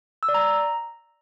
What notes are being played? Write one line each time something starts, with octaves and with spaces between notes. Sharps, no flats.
E6
D5
A#5